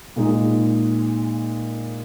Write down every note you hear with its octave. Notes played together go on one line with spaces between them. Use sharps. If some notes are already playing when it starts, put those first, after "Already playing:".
A#2 G#3 D#4